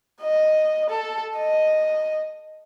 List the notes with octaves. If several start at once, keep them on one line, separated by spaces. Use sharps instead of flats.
D#5
A4
D#5